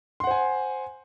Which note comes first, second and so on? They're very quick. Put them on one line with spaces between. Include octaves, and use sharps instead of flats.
C6 F#5 C5 G#5